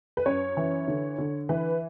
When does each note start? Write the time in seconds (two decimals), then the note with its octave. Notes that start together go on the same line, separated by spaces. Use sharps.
0.17 B4
0.26 F#2 C#5
0.57 E3
0.88 D3
1.18 D3
1.49 E3 B4